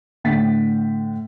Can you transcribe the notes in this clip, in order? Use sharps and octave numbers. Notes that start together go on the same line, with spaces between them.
A2 D3 F#5 G5 A6 B6